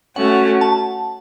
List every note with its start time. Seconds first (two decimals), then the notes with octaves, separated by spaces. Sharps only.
0.16 A3 C#4 F#4 F#5
0.61 A5